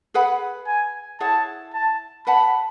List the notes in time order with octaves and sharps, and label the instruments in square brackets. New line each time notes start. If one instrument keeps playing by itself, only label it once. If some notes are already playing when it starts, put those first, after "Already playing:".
[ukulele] G#4 B4 F#5 B5
[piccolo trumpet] G#5
[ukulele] E4 G#4 C#5 F#5 [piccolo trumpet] A5
[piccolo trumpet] A5
[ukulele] B4 F#5 A5 [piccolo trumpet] B5